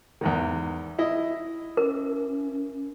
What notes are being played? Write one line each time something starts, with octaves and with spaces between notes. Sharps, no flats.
E2 G#2 D#3
E4 D#5
C#4 A#4